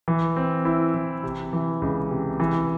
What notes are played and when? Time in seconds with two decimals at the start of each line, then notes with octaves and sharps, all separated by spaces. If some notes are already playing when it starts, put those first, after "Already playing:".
0.08 E3
0.36 C4
0.65 E4
0.94 E3
1.23 C3
1.53 E3
1.82 C#2
2.11 C3
2.40 E3